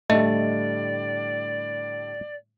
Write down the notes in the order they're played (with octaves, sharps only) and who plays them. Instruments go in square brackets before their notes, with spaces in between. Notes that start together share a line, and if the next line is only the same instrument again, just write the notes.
[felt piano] A2 D3 G3 [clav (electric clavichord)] A3 [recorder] D5 [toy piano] D#5